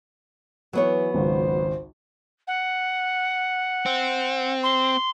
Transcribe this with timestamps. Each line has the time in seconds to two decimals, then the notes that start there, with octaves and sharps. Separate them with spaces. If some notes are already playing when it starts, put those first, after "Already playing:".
0.73 E3 F#3 B3 C#5
1.14 G#1 C#2 C5
2.47 F#5
3.86 C4
4.63 C6